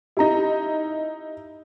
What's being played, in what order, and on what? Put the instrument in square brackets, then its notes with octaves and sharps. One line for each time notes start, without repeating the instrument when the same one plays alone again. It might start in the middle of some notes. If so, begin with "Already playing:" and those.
[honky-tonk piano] D#4 E4 [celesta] G4 A#5